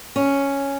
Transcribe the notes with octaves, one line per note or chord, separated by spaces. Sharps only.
C#4